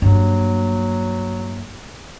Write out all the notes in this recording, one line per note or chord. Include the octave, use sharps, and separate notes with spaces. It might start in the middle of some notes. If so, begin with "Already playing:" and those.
G2 F#3 A#3